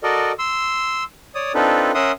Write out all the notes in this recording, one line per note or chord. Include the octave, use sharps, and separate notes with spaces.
F#4 A4 A#4 D5 D#5
C6 E6
C#5 D5 D#6
C4 D4 D#4 F4 A4 B4
C#4 A#4 E5 F#5 C6 D#6